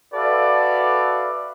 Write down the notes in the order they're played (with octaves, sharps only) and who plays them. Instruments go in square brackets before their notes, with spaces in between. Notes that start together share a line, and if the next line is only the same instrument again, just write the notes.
[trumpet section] F#4 A4 B4 D5 E5 F5